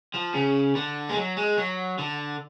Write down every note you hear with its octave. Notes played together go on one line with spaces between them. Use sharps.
F3
C#3
D3
G#3
F#3
G#3
F#3
D3